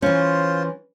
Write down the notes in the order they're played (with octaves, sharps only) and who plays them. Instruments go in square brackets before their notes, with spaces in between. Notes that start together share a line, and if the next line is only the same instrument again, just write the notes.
[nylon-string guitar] E3 C#4 [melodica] F4 C5